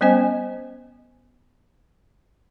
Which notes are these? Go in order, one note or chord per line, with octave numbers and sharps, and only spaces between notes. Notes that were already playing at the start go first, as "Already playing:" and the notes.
G3 B3 C#4 C5 D#5 G#5